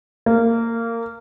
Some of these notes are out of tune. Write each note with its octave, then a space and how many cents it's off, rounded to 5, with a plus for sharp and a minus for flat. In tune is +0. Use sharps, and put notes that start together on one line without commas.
A#3 -20